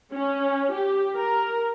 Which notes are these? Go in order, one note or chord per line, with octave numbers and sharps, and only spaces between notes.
C#4
G4
A#4